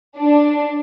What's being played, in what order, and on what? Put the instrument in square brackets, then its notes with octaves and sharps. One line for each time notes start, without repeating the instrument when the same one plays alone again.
[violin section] D4